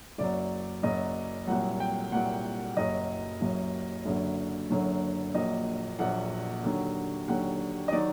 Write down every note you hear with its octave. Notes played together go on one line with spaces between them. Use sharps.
F#1 F#2 F#3 D5
F#1 F#2 F#3 D#5
C2 A#2 F#3 F#5
G5
C2 A#2 F#3 F#5
F#1 F#2 F#3 D#5
F#1 F#2 F#3
F#1 F#2 D3 F#3
F#1 F#2 D3 F#3
A#1 A#2 F#3 D#5
A#1 A#2 F#3 F#5
D#2 D3 F#3
D#2 D3 F#3 F#5
D#5
D#3 F#3 D5